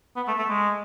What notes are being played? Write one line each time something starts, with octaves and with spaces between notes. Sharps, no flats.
B3
A3
A3
G#3